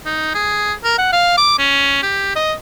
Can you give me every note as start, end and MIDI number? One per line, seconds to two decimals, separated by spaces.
0.06 0.33 63
0.35 0.74 68
0.84 0.98 70
0.98 1.09 78
1.13 1.35 77
1.38 1.55 86
1.59 2.01 61
2.03 2.35 67
2.36 2.53 75